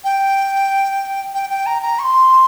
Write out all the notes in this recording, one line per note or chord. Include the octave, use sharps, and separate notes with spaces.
G5
G5
G5
A#5
A#5
C#6
C6